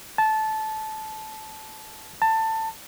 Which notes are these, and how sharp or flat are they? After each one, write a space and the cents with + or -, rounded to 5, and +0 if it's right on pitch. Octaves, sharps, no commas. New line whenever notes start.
A5 -15
A5 +20